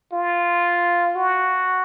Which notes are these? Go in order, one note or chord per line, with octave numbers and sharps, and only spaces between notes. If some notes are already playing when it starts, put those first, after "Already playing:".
F4
F#4